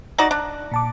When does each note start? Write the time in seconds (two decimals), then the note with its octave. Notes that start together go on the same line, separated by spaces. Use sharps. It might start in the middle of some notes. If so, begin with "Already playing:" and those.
0.18 D#4 F#4 D5
0.31 D4
0.71 A#2 A5 D6